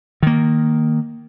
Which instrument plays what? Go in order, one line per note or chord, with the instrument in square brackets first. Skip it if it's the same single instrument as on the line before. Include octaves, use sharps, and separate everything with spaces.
[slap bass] D#3 A#3